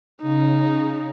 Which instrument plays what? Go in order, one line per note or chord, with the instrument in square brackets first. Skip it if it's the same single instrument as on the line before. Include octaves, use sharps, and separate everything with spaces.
[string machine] C#3 [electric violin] D#4